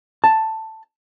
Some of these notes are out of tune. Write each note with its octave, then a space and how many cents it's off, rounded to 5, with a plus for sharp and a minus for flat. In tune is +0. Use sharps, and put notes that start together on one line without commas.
A5 +5